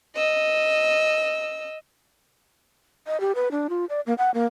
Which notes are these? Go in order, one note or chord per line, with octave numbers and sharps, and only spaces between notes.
D#5 E6
D#5
G4
B4
D4
F4
D5
A#3
F#5
A#3